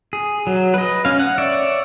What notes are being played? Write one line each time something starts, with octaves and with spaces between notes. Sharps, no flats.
G#4
F#3
B4 D#5
C#4 F5
F#5
C#5 D5 E5